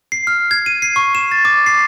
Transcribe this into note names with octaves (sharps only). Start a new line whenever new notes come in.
C7
F6
G#6
D#7
C7
C#6
E7
A6
D6
C7